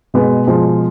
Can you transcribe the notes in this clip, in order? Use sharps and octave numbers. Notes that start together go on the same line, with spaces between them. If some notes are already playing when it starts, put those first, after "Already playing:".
B2 G#3 B3
B2 F3 G#3